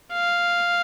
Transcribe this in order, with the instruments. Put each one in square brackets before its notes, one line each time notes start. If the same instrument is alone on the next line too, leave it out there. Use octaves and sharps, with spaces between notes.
[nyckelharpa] F5